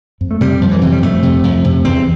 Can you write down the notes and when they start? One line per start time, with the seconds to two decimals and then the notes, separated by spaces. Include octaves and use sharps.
0.21 F2
0.31 A3
0.41 C3 G3
0.61 F2 F3
0.71 E3
0.81 C3
0.92 G3
1.02 F2 A3
1.23 C3
1.44 F2
1.64 C3
1.85 E2 C4